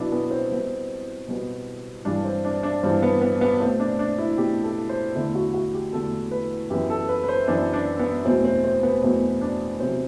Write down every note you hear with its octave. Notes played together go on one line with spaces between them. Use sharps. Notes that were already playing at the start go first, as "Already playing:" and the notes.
Already playing: B2 F#3 B3 D4 E4
B3
C4
B2 G3 B3
B2 G3 B3
G2 E3 G3 D4
C4
D4
D4
G2 E3 G3 C4
B3
B3
B3
B2 A3 C4
D4
D4
E4
B2 A3 G4
A4
C5
E2 D3 A3 E4
F#4
F#4
G4
E2 D3 A3 A4
B4
F#2 E3 B3 G4
A4
B4
B4
C5
F#2 E3 B3 D4
D4
B3
E2 B2 F#3 A3 C4
C4
C4
B3
E2 B2 F#3 A3 C4
D4
E2 C3 F#3 C4